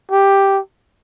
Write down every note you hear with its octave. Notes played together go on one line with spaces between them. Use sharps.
G4